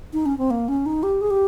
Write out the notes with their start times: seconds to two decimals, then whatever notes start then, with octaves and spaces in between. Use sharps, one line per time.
0.13 D#4
0.26 C#4
0.38 C4
0.51 A#3
0.68 C#4
0.86 D#4
1.03 G4
1.21 G#4
1.31 G4